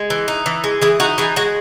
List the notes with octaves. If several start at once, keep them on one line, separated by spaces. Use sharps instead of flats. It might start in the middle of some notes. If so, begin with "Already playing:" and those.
Already playing: G#3
E3
D#4
E3
G#3
E3 G#4
D#4 F#4
E3 G#4
G#3 F#4